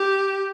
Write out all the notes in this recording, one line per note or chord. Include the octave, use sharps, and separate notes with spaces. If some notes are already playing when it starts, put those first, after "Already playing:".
Already playing: G4